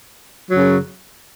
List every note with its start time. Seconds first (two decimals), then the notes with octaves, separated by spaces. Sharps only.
0.51 F#2 C#3 F#3